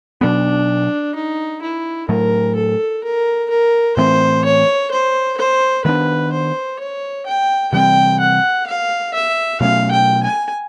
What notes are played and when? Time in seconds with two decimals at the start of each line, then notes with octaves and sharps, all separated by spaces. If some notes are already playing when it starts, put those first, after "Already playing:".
0.21 B2 F#3 B3 D4
1.15 D#4
1.62 E4
2.09 A2 F#3 A3 A#4
2.56 A4
3.04 A#4
3.50 A#4
3.97 A2 E3 A3 C4 C5
4.45 C#5
4.91 C5
5.38 C5
5.85 D#3 G#3 B4
5.88 B3 D4
6.32 C5
6.79 C#5
7.26 G5
7.72 C3 E3 G3 C4 G5
8.20 F#5
8.67 F5
9.14 E5
9.60 B2 F#3 A3 C#4 F5
9.91 G5
10.23 G#5